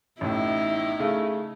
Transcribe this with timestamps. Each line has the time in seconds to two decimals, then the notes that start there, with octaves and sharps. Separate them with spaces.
0.21 A1 A2 D#4 E4
0.99 C#3 A3